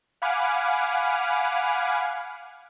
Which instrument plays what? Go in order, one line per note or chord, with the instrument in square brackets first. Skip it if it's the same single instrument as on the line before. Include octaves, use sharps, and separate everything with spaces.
[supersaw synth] F5 F#5 G#5 B5 D6 F6